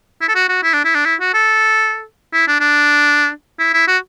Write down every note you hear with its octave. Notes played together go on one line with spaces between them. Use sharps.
E4
A4
F#4
F#4
E4
D4
E4
D4
E4
F#4
A4
E4
D4
D4
E4
E4
F#4